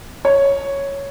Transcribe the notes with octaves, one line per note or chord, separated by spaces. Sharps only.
C#5